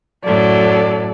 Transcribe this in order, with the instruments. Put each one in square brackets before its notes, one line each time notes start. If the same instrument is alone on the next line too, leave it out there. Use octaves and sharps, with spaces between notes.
[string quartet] F#2 A2 F#3 [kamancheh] A4 D5